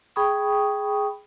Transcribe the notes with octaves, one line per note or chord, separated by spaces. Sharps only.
G#4 G5 B5 C#6 D#6